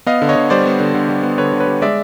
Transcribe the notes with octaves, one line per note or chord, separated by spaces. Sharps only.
B3 D#5 F5
D3
C#5 D#5
D3
G3 C5 D5
B3
D3
D3
G3
B3
D3 B4 C#5
D3
B4 C#5
G3
G#3 D5 E5